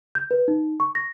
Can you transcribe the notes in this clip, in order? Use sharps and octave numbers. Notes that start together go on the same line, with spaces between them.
G6
B4
D#4
C#6
A#6